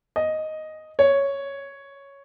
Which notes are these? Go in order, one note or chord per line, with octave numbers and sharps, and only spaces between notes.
D#5
C#5